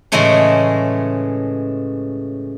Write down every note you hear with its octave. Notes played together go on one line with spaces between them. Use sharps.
A2 C#3 E3 G#3 A3 C#4